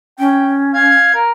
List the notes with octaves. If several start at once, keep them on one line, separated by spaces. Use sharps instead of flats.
C#4 G5
F5 G#6
A#4